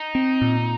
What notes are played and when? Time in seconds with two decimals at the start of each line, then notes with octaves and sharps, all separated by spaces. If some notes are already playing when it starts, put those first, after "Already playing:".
Already playing: D#4
0.15 C4
0.42 A#2